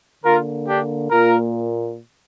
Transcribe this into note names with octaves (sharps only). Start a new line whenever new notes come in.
D3 A#3 F4 A#4
D4 G4
A#2 A#3 F4 A#4